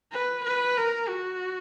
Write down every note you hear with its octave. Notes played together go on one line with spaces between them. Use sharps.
B4
B4
A#4
F#4